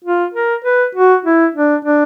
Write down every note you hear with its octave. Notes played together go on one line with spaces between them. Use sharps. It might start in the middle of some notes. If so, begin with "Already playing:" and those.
F4
A#4
B4
F#4
E4
D4
D4